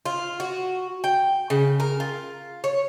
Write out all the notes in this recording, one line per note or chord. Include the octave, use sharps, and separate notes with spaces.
F4
F#4
G5
C#3
A#4
F4
C#5